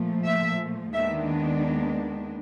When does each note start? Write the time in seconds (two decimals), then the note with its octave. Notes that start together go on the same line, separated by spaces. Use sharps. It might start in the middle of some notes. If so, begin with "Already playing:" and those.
Already playing: A#2 F3 A3
0.26 E5
0.93 D#2 D#3 G#3 B3 D4 E5